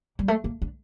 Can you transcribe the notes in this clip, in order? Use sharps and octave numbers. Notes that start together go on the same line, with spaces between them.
G3
A3
A#3
D4